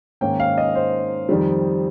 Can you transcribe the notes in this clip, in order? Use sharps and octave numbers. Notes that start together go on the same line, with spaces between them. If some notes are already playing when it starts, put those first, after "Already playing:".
G#2 D#3 A#3 C#4 G5
F5
D#5
C5
F2 D#3 G3